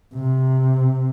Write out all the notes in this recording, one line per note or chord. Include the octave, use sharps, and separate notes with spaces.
C3